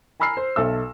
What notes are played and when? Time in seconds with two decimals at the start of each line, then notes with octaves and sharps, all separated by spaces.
0.20 G#5 A#5 B5 E6 F6 C7
0.37 C5
0.56 B1 A4 E5 E6